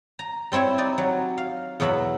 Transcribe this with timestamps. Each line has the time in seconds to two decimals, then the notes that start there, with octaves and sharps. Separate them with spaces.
0.19 A#5
0.52 G3 C4 E4 C#5 E5
0.78 D#4 D5
0.98 F#3
1.38 F5
1.80 E2 B2 F#3 E5 B5